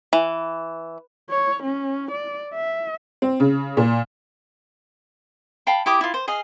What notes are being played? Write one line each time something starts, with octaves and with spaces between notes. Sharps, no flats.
E3
C#5
C#4
D5
E5
C4
C#3
A#2
F5 G5 A5 B5
E4 G4 D6 D#6
E4 F4
C5
G#4 D#5 F5